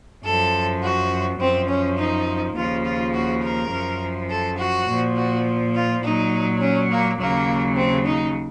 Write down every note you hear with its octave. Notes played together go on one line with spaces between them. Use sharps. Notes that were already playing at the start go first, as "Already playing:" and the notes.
F#2 F3 A4
F#4
F#2 F3 C4
C#4
D#4
D#2 C#3 F3 F4
F4
F#4
A#4
F#2 F3
A4
F#4
A#2 F3
F#4
F4
A#2 F#3 D#4
C#4
A#3
D#2 C#3 F#3 A#3
C4
D#4